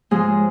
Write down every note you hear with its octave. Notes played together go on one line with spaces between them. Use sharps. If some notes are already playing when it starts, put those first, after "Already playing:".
G#2 F3 G#3 G#4